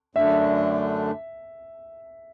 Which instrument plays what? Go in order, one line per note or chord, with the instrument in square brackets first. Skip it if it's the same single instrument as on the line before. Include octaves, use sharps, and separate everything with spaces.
[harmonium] F#2 D3 A3 D4 [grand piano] E5